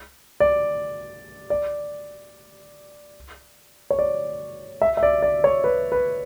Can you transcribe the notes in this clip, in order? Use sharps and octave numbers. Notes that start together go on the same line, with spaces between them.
D5
D5
C#5
D5
E5
E5
D5
D5
C#5
B4
B4